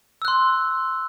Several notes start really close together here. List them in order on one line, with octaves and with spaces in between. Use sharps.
E6 F#6 C6